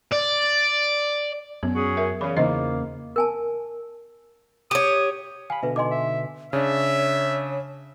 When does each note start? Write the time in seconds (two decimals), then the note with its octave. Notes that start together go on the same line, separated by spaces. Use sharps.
0.12 D5
1.63 F#2 B3
1.75 C#4 F#4 G#4
1.97 A#4 E5
2.21 C#3 E3 B5
2.37 E2 C#3 A#3 D#4 C5 D#5
3.16 A#4 G#5 A5
4.71 G4 C#5 D#6
5.50 F5 G#5 B5
5.63 B2 D3 B4 E5
5.76 D#4 D#5 G#5 C6 D6
5.91 E5
6.53 C#3 D4 C#5 E5